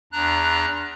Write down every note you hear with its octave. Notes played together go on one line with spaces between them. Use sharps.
E2 D4 A#5 F#6